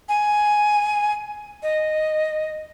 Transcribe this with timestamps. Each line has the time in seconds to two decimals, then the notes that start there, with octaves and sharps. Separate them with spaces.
0.09 G#5
1.63 D#5